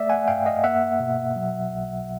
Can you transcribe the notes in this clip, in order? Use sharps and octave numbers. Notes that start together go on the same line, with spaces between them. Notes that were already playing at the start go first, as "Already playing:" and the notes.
Already playing: A3 D5 E5
F#5 G#5
G2 F5 G5
D#5 F5
A#3 E5 F#5
B2
F#3
B1